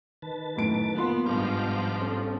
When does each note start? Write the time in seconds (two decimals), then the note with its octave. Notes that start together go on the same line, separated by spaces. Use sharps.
0.22 D#3 B4 A5
0.56 F#2 A2 D7
0.94 A#3 B3 F4 C6
1.26 G1 G#2 B2 F3 D6 F6 G6
2.01 C4 C#4 A4